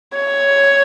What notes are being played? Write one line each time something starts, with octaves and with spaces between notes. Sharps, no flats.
C#5